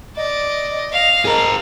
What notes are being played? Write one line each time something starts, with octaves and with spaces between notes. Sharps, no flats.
D5 D#5
F5
G#4 A#4